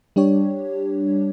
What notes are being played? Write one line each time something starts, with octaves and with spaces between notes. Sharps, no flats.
G3 D4 G4 C#5